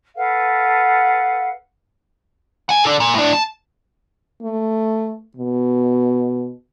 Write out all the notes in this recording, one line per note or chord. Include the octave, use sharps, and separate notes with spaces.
A4 B4 F5 F#5
F#5 G#5
D4 A4
A#2
A2 D4
A5
A3
B2